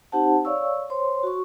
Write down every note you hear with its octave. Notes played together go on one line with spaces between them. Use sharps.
C4 D#4 G4 C5 F#5 A5
C#5 D5 F5 C#6 E6
C5 C#5 C6
F#4 C#6